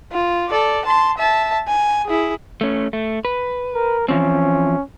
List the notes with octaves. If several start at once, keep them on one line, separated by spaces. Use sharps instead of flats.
F4
A4 D5
A5 C6
E5 A5
G#5
E4 G#4
A3 C#4
A3
B4
A#4
E3 F3 C4 C#4